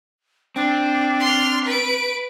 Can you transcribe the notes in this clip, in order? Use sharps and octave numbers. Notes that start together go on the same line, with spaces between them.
C4 D4
C6 F6
B4 D7